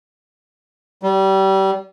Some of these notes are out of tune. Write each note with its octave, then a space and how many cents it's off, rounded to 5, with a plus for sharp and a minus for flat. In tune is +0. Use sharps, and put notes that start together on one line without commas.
G3 -25